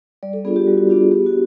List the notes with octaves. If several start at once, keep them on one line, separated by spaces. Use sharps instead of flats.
G3 D5
A4
B3 D4 F4 G#4
G4
G3 F#4
F#4
B3 D4 F4 G4
G#4
B3 G4
F#4